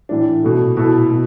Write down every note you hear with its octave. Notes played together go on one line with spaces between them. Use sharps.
A2 E3 D4
B2 A3 E4
B2 A3 E4 A4
B2